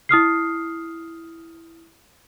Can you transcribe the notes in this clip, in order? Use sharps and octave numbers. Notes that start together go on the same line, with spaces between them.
E4 D#6 F6 C7